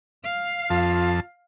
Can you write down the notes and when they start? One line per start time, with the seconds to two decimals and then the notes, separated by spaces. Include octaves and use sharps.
0.24 F5
0.70 F2 F4 A5